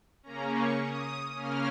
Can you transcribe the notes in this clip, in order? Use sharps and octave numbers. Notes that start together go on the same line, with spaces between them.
C#3 A#3 C#4 A#5
C#6
D#6
C#3 A#3 C#4 F6